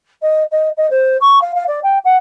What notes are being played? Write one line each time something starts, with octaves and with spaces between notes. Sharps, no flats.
D#5
D#5
D#5
C5
C#6
F5
F5
D5
G5
F#5